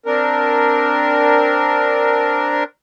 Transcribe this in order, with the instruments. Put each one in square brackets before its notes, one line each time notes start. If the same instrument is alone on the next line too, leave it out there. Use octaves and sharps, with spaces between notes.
[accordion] C4 D4 A#4